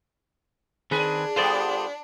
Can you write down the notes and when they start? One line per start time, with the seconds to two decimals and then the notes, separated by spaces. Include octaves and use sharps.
0.91 D#3 C4 D4 G#4 B4
1.36 G3 B3 F4 A4 C5 D5